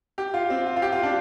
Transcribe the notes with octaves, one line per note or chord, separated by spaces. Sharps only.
G4
F4
C4
F4
F4
G4
F4
D4